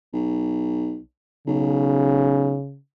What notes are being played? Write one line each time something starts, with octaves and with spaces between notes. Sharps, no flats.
B1
B1 C#3